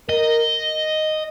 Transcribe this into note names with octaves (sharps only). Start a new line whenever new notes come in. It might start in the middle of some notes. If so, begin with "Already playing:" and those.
A#4 D#5